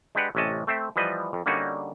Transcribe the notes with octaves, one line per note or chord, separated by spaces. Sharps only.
G#3 D4 G4 B4 F#5
A1 C3 C#4 D#5 A5
A3 C4 C5 E5
E3 F3 G3 B4 D#5
F2
D3 G3 A#3 C#4 D#4 F#4